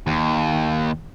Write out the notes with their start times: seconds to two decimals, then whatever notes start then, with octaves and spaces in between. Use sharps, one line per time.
0.07 D#2